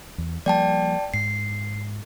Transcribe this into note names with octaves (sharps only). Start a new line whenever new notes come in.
E2
F3 G3 A#3 D5 G5 A5
G#2 C7